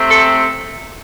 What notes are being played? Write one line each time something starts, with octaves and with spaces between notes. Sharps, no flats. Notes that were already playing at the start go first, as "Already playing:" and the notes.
Already playing: C3 A3 C4
A4